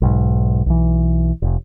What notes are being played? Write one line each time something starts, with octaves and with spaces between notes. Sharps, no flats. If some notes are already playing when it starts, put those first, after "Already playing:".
B1 G#2
B1 E3
F1